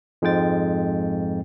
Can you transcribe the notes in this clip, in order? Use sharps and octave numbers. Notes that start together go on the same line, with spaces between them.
F2 G#2 G#3 G5 A6